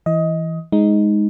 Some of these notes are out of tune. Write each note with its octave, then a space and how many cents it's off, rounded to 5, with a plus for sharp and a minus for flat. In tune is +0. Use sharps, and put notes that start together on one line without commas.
E3 +0 D#5 +20
G#3 +0 D#4 +5